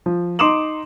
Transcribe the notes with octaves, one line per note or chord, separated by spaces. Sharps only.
F3
D#4 C6 D6 D#6 E7 F#7